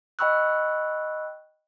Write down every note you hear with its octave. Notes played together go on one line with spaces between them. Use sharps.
D#5 G5 B5 C#6 E6 F#6